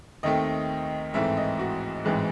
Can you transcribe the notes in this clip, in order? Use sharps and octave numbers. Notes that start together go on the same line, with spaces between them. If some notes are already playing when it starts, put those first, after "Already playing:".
D#2 D#3 A3 C4 D#5
A1 G#2 E3 A3 C4 E5
D#5
F#4
A1 G#2 E3 G#3 C4